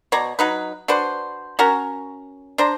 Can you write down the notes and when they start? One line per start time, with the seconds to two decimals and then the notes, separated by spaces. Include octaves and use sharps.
0.12 B2 C#5 D5 A#5
0.39 F#3 D#4 B4
0.88 D4 F#4 B4 C5
1.59 C#4 F#4 A#4 A#5
2.58 D4 C5 A#5